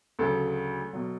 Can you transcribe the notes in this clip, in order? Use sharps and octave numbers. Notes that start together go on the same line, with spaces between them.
D2 C#3 F#3 A4
B2 F#3